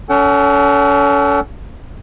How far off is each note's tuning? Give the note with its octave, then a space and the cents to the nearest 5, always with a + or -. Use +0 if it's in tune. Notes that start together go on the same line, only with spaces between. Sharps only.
C#4 +35 A4 +0 F#5 +45